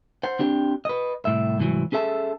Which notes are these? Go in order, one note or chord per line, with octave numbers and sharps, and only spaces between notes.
C5 F#5
C4 D4 G4
B4 D#5
C2 A2 E5
C2 G#2 B2 E3 F#3
C#4 G#4 A4 E5 A5